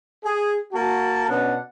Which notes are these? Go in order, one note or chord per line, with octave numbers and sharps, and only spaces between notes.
G#4
A#3 F#4 A5
B2 C#4 D4 F#5